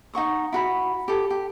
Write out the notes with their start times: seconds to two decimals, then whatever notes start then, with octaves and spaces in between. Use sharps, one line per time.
0.14 D#4 F#5 C#6 D#6
0.52 E4 F#4 B5
1.08 G4 A4
1.30 G4